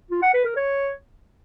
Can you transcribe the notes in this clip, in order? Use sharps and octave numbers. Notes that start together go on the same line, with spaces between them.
F4
F#5
B4
A#4
C#5